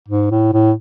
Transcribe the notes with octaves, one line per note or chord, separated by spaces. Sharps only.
G#2
A2
A2